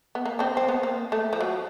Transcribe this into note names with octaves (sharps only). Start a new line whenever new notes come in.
B3
A#3
C4 D4
C4
B3
A#3
A3
F3
F#3